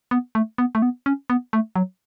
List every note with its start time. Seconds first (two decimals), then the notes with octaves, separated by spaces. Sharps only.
0.11 B3
0.35 A3
0.58 B3
0.75 A3
0.82 B3
1.06 C#4
1.30 B3
1.53 A3
1.76 F#3